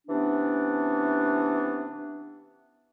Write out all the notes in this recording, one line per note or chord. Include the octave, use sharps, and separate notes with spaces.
C3 E3 B3 C#4 D4